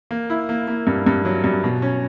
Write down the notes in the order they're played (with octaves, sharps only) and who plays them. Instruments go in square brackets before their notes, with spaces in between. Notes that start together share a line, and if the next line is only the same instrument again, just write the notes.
[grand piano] A#3
E4
A#3
A#3
G2
G2
F#3
G2
B2
C#4